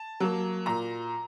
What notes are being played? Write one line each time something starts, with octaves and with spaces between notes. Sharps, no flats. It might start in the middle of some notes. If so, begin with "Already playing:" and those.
Already playing: A5
F#3 A#3
A#2 A#5